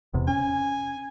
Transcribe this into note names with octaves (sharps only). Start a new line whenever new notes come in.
E1 E2 C3
C#4 G#5